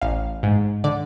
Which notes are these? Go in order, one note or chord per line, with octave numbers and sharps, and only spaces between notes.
A1 F5
G#2
D3 D5